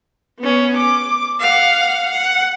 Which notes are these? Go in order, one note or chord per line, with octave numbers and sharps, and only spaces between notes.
B3 C#4
D6
F5 F#5
F#5